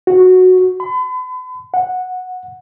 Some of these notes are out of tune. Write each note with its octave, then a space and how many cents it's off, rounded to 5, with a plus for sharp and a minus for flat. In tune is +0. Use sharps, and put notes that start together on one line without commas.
F#4 -5
B5 +40
F#5 -10